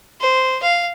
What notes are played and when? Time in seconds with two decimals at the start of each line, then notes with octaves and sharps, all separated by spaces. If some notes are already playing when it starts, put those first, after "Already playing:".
0.21 C5
0.63 F5